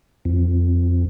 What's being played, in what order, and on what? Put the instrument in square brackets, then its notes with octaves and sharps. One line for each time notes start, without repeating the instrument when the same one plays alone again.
[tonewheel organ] F2